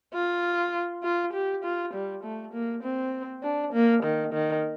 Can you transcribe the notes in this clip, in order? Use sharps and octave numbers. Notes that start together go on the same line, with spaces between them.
F4
F4
G4
F4
G3
A3
A#3
C4
D4
A#3
D#3
D#3